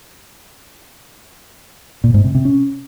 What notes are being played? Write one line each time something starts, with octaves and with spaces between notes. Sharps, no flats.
A#2
G#2
C3
C3
C#4